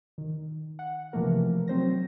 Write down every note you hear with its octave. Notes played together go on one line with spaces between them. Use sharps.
D#3
F#5
C3 E3 F3 A3 A#3 A#4
F#3 C4 C5 A#6